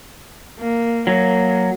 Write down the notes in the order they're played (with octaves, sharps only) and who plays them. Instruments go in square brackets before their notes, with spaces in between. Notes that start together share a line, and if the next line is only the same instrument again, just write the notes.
[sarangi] A#3
[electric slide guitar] F#3 [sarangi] A#3